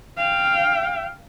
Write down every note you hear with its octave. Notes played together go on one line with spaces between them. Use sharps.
F5 G5